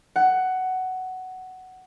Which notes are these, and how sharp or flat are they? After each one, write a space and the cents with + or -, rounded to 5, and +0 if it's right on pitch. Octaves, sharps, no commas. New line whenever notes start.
F#5 +10